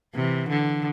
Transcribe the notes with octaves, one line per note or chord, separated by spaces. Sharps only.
C3 E3
D3